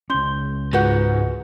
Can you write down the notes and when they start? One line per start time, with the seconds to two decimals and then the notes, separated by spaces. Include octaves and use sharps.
0.10 C#2 C#4 C6 G6 G7
0.73 G#2 F4 F#4 B4 F#5 G6